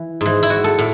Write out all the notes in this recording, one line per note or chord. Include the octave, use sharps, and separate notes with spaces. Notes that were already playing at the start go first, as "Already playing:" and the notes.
Already playing: E3
G#2 E3
E4
F#4
A4
A2